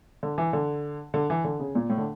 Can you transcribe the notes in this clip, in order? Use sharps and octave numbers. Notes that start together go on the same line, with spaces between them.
D3
E3
D3
D3
E3
D3
C#3
A#2
A2
D3